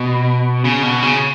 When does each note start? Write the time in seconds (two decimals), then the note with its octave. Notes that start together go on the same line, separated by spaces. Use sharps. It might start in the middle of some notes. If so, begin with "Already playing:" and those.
Already playing: B2
0.65 C#3
0.83 B2
1.02 C#3